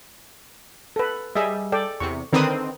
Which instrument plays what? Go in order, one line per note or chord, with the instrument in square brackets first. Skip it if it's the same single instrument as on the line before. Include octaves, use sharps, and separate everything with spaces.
[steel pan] A4 B4
[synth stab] G3 [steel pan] G#4 D#5 E5
[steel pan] A4 D5 G5
[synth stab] E2 C3 [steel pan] C#6
[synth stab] D3 D#3 C4 [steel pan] A#4 B4 D#6